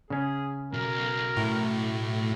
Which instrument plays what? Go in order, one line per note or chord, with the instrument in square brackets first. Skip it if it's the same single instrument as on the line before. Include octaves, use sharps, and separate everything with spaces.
[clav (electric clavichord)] C#3 C#4 [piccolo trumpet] G#4
[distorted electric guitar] B1 [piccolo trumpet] A#4
[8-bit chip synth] A2